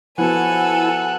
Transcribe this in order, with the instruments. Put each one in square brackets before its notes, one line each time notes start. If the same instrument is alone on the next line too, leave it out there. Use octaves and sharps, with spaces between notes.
[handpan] F3 B3 F#4 [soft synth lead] E4 [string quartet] A4 G#5 [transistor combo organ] F#5